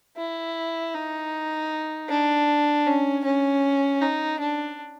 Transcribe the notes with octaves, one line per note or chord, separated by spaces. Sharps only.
E4
D#4
D4
C#4
C#4
D#4
D4